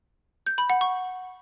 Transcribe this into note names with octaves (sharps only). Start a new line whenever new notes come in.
G6
B5
F#5
C#6